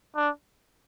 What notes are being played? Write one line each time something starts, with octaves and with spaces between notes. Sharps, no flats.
D4